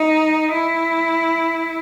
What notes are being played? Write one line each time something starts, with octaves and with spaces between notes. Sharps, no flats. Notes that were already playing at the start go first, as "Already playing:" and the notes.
Already playing: D#4
E4